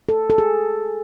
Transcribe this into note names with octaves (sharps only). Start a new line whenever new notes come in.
A4
A4
G#4